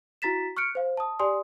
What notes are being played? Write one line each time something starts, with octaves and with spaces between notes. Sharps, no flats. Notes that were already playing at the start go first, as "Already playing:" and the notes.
E4 F#4 A#5 A6 B6 E7
C#6 F6 F#6 C#7 D7
C5 F5
A5 D#6
G4 D5 G#5 C6 D#6